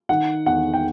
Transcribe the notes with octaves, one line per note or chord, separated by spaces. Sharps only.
D#3 F#5
E2 F#5
G5